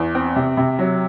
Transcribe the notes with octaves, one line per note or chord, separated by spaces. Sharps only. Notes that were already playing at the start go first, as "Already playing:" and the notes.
Already playing: E2
C4
C3
C3
F#3